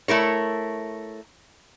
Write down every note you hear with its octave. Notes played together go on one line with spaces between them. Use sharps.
A3 E4 A#4 C#5